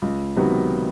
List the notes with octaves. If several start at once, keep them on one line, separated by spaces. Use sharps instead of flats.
C#2
C3 D#3 F#3 B3